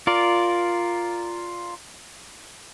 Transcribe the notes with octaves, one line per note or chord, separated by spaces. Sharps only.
F4 A#4 D5